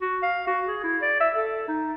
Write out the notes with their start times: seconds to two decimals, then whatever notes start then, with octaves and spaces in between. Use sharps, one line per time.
0.01 F#4
0.22 F5
0.47 F#4
0.67 G#4
0.83 E4
1.02 D5
1.20 E5
1.34 A4
1.68 D#4